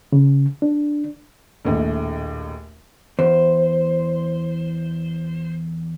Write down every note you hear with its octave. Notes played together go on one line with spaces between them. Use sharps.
C#3
D4
A#1 D#2 A2
E2 C5